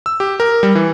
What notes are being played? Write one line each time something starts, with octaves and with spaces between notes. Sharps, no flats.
E6
G4
A#4
G3
E3